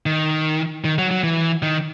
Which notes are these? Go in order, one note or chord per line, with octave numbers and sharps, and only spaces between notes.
D#3
D#3
F#3
F#3
E3
D#3